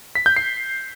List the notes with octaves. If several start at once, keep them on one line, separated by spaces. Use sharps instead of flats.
B6
G6
C7